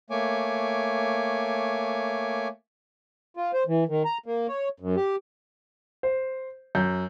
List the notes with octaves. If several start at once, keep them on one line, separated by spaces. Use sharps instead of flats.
A3 A#3 C#5 G#5 D6
F4
C5
E3
D#3
A#5
A#3
C#5
F#2
G4
C5
F#2 G6